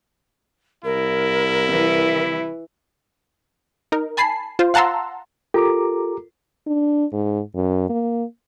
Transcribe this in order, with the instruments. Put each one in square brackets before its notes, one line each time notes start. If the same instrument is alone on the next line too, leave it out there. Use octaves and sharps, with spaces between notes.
[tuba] C2 [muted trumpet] E4 [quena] A#4
[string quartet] E3
[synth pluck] D#4 A#4
G#5 A5 B5 C7
F4 C5
F5 F#5 A5 A#5 C6 E6
[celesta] F4 A4 A#4 [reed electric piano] G4 A#5 D6
[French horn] D4
G#2
F#2
A#3